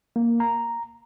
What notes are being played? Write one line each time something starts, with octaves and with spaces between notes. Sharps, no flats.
A#3
A#5